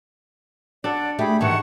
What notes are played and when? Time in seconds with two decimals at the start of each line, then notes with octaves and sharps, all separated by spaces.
0.84 D4 A4 D5 F#5
1.19 A3 G4 G#4 B5
1.41 G#2 D#3 E3 F#5 A5 C#6